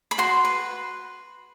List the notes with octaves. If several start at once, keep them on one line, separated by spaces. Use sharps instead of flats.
B5
F#4 C6
B4